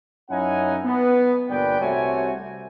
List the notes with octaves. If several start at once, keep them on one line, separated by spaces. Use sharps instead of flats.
F#2 C#4 D#4 E4 F#5 G#5
B3
G1 A#2 B4 D5 G5
C2 C3 A3 F#4 C#5 G#5